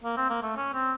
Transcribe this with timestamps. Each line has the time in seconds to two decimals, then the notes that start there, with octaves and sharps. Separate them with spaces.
0.04 A#3
0.17 C4
0.30 A#3
0.43 A3
0.57 C#4
0.74 C4